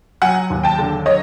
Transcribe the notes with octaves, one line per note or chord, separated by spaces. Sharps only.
F#3 F#5 G#5
D#2
G5 A5
D3
F#3 C#5 D#5